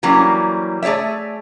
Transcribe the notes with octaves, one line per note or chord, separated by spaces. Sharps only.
E3 F#3 G3 A#3 C#4
A3 G#4 C#5 D5 E5